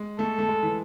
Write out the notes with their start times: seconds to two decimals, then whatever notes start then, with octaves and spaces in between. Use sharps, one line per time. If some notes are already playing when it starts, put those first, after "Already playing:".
Already playing: G#3
0.19 A3 A4
0.39 A3
0.49 G#3
0.63 E3